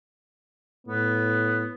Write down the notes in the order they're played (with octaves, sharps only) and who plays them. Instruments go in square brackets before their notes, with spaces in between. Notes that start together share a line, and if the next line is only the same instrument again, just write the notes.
[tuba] A2 [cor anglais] B3